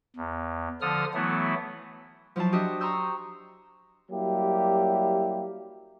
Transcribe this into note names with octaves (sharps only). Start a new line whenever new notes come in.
E2
D3 F3 A4 D#6 F6
E3 F#3 A3 B3 E4
F3 F#3 E4 F4 A5
D4 F#4 G4 D#5 E5
A#5 C6 C#6 D#6 E6 G6
F#3 G3 A#3 E4 G4